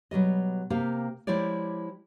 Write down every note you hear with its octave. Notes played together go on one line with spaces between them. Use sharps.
B2 F#3 G3 D#5
C3 A#3 G4 F5
F3 G#3 E4 G4 C#5 D5